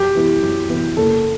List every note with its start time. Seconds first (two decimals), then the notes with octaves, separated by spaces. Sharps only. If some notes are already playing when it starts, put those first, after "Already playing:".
Already playing: F#2 G4
0.15 E3 B3 E4
0.42 F#2
0.69 E3 B3 E4
0.97 F#1 A4